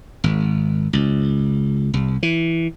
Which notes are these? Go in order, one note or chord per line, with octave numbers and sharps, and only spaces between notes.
G#1
C#2
C2
E3